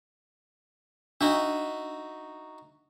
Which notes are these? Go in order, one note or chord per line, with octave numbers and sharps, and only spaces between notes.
D4 D#4 F#4 E5